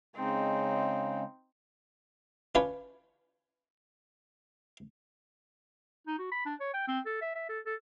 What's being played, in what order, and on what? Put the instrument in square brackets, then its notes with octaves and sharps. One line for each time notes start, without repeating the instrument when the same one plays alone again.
[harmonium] C#3 G#3 [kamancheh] C4 D#4
[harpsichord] C#4 D4 F4 B4 C#5
[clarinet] D#4
F#4
B5
D4
C#5
G5
C4
A4
E5
E5
A4
A4